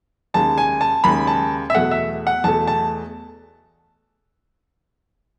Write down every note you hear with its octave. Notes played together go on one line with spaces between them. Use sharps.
D#2 C#3 G#3 A5
G#5
A5
D#2 C#3 G#3 B5
A5
E5
E2 B2 A3 F#5
E5
F#5
E2 B2 A3 A5
A5